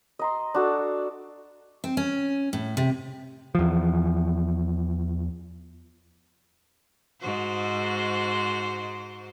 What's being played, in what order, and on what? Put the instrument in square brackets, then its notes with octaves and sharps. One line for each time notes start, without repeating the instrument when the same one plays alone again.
[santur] D#5 A#5 C6
D4 F#4 A4
[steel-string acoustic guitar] C4
C#4
A2
C3
[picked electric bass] E2 F3
[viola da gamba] G#2 F#4 C5